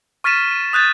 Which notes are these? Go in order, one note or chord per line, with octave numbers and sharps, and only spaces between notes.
C#6 F6 A6 B6 D#7 E7
D#6 F#6 G6 A6